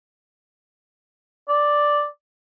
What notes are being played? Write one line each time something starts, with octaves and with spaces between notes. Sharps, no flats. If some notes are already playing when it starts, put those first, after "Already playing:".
D5